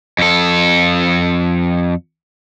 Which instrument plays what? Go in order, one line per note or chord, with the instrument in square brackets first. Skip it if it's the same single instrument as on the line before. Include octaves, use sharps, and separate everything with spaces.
[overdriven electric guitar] F2 A4